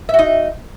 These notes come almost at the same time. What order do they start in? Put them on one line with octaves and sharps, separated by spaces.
E5 F#4 D#4